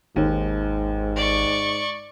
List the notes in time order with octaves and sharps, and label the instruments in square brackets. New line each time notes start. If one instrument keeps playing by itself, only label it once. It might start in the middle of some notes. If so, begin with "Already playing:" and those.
[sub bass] G#1 [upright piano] D#2 [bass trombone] G#2
[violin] D5 C#6